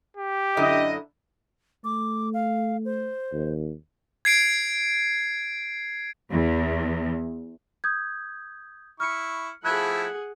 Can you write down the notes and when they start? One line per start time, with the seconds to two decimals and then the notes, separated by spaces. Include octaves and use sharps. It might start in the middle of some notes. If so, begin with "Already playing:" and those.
0.17 G4
0.57 F#2 D3 E4 D#5
1.84 A3 D6
2.34 F5
2.85 C5
3.32 D#2
4.25 G#6 C7 D7
6.31 E2
7.84 D#6 G6 G#6
9.00 E4 C#6 F6 C#7
9.65 F3 A3 E4 G#4 F#5 F#6 G#6